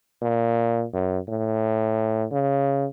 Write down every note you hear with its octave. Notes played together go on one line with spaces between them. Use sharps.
A#2
F#2
A2
C#3